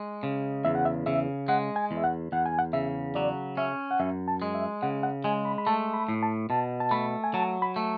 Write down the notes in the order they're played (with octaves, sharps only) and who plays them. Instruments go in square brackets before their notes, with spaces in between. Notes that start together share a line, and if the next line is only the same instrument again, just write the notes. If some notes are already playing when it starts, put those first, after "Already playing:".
Already playing: [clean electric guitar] G#3
C#3
[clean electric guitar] E2 [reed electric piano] E5
[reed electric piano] F#5
E5
[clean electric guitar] C#3 [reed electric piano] E5
[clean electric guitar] G#3 [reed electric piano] F#5
[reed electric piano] G#5
[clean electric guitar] E2
[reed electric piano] E5
F#5
[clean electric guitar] E2 [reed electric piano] F#5
[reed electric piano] G#5
F#5
[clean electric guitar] C#3 [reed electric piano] E5
[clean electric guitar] F#3 [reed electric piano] D5
[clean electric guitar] C#4 [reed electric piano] E5
[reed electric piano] F#5
[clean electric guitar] F#2 [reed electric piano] E5
[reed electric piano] A5
[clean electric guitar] G#3
[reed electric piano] E5
[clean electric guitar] C#3 [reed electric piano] F#5
[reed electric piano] F#5
[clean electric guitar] G#3 [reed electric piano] G#5
[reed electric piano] B5
B5
[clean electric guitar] A3 [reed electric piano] A5
[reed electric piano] B5
[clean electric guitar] A2
[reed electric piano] A5
[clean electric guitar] B2 [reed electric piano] A5
[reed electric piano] A5
[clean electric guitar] A3 [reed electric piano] B5
[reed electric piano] G#5
[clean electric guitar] F#3 [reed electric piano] A5
[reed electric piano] B5
[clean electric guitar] A3